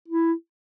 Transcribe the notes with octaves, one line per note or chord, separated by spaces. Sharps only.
E4